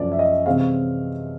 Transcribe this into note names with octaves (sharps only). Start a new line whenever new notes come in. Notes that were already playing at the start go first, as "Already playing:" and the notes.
Already playing: F#2 C#3 F3 A3 C#4 D5
E5
D#5
C3 E3 G#3 C4 F5